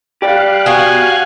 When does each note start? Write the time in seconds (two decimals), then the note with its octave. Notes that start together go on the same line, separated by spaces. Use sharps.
0.22 G4 D5 F5 F#6
0.66 B3 F#4 G#5